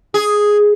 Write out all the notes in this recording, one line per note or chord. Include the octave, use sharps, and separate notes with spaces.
G#4